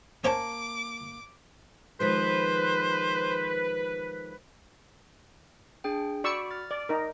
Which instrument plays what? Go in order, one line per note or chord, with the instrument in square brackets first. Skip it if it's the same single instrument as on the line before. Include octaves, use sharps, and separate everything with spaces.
[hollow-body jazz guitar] A#3 A5 [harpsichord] C#4 C5 C#5 [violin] D6
[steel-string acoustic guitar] D#3 F3 G#3 [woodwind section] B4 [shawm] C5
[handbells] D4 G#4 G5
[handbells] F#4 B5 [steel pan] D5 C#6 E6
[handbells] F6 A6
[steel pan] D5
D#4 A#4